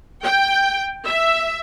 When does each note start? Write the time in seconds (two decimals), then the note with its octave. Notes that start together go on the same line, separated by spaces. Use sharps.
0.23 G5
1.05 E5